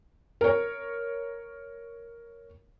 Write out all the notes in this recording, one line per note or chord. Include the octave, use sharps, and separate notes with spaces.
A#4 C#5